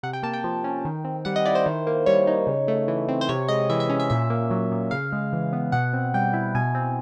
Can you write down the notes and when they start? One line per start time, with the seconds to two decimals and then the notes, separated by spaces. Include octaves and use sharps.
0.03 C3 F#5
0.13 G5
0.23 A#3 A5
0.33 G5
0.44 F3
0.64 C#4
0.85 D#3
1.05 C4
1.25 G3 F#5
1.36 D#5
1.45 E4 D5
1.55 C5
1.66 D#3
1.87 A#3
2.06 G3 C#5
2.27 D#4
2.47 C#3
2.68 A3
2.88 E3
3.08 C4
3.21 C5
3.29 C3 C#5
3.48 G#3 D#5
3.70 E3 E5
3.80 E5
3.90 C#4
4.00 E5
4.10 A#2 E5
4.30 A#3
4.50 F#3
4.71 A#2
4.91 C#3 F5
5.12 G#3
5.33 E3
5.53 B3
5.72 B2 F#5
5.93 C4
6.14 G3 G5
6.33 E4
6.55 B2 G#5
6.75 C4